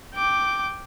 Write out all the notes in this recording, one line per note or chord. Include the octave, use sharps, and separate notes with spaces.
G5 D6